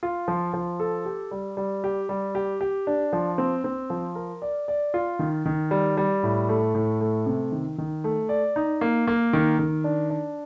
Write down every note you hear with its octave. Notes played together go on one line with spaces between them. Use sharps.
F4
F3
F3
A4
G4
G3
G3
G4
G3
G4
G4
D4
F3
C4
C4
F3
A#4
D5
D5
F4
D#3
D#3
G3
G3
A2
A3
A2
A3
C3
D#3
D#3
A3
D5
D#4
A#3
A#3
D#3
D#3
D4
D4